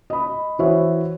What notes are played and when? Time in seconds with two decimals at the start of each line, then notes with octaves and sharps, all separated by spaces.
0.10 D#5 B5
0.59 E3 F#4 C5 C#5 E5